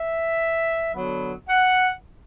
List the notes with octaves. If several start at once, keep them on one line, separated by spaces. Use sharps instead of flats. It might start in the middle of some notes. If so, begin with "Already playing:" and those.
Already playing: E5
D3 F#3 B3
F#5